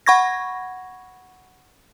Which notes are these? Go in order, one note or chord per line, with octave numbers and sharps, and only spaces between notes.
F#5 B5 C#6 G#6 A#6